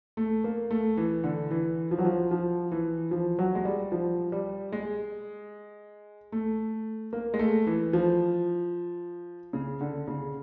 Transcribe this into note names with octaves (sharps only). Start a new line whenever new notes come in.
A3
A#3
A3
E3
D3
E3
F3
F#3
F3
F3
E3
F3
F#3
G#3
G3
F3
G3
G#3
A3
A#3
G#3
A3
E3
F3
C#3
D3
C#3